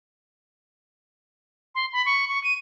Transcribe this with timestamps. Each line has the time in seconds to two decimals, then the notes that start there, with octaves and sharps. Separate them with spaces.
1.75 C6
1.93 B5
2.06 C#6
2.29 C#6
2.44 D#7